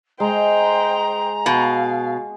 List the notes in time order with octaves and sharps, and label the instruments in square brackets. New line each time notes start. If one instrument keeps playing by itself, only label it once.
[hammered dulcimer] G#3 [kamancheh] C5 G5 [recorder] A#5
[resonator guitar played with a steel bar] B2 [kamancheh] F5